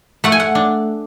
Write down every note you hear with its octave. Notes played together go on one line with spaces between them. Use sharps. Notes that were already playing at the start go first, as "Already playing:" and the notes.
A3 F#5
G#5
F#5
D4